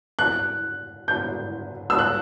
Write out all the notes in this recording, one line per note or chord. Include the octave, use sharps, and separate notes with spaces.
F#6
G6
E6
F#6